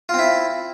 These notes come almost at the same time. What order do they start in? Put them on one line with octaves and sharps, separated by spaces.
F4 C4 E4